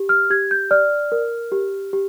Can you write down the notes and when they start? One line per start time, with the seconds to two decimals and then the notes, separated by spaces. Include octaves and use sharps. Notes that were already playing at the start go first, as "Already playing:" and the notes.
Already playing: G4
0.09 F6
0.30 G4 G#6
0.51 G6
0.71 D5 F6
1.12 A#4
1.52 G4
1.93 G4